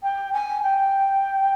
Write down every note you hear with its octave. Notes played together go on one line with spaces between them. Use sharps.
G5
G#5
G5